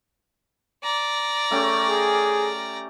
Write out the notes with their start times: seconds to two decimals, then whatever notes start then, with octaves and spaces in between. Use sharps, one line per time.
0.83 D5 A#5
1.51 A3 C#4 G4
1.89 G#4